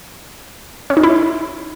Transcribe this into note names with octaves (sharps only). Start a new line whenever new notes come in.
C#4
D#4
E4